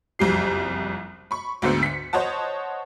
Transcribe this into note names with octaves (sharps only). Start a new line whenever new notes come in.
F#1 C2 F2 G4 C7
B5 C#6
D2 G#2 D3 B3 C5 C#7
B6 C#7
C5 C#5 D#5 F#5 A5